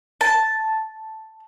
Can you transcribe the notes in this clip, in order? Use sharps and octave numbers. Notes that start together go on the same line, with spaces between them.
A5